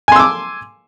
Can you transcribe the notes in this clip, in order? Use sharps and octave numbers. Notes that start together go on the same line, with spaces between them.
G#5 C6 D6 E6